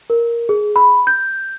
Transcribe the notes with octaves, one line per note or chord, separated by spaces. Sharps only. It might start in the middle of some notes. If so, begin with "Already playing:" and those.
A#4
G#4
B5
G6